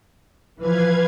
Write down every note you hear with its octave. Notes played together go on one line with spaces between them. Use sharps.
E3 F3 B4 F5 G#6